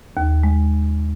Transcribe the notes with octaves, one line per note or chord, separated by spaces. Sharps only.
D#2
G#3